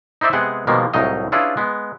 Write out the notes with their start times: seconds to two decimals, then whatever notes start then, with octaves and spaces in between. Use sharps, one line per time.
0.21 D#4 E4 C5 D5 E5
0.33 C3 G#3 B3 G#4 F#5 G5
0.67 B2 D#3 F3 G3 G#3 A#3
0.93 C2 A2 F#3 D#4 D#5 F5
1.32 C#4 D4 E4 F4 G#4 B4
1.57 G#3 B3